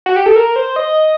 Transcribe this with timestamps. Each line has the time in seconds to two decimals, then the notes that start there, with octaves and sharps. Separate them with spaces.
0.06 F#4
0.16 G4
0.26 A4
0.36 A#4
0.56 C5
0.76 D#5